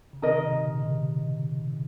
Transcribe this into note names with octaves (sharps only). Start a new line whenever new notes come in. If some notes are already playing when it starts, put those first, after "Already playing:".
C#3
C3 D#3 D#4 A#4 D#5
C3
A#2 C#3
C#3
C3 D#3